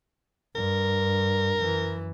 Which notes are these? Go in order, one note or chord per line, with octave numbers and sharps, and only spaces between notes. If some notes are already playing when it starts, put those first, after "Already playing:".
G2 A#4
F#2 E3